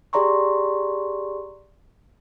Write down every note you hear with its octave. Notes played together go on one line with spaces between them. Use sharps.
G4 G#4 D5 A#5 C6 C#6